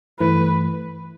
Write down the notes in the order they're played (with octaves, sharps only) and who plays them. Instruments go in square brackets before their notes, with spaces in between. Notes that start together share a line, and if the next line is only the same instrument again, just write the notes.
[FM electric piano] G2 E3 A3 E4 [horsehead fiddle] B4